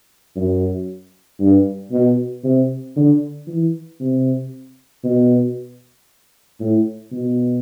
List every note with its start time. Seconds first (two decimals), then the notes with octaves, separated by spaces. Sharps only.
0.36 F#2
1.40 G2
1.91 B2
2.44 C3
2.96 D3
3.47 E3
4.00 C3
5.04 B2
6.60 A2
7.12 B2